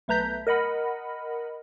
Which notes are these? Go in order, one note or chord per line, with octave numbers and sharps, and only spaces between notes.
B1 A3 B4 A#5 G6 B6
A#4 D#5 F#5 B5